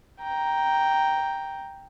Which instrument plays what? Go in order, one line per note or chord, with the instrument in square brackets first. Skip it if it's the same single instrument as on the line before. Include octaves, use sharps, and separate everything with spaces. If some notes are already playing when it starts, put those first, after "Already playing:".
[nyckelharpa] G5 A#5